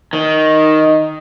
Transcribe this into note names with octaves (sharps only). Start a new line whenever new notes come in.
D#3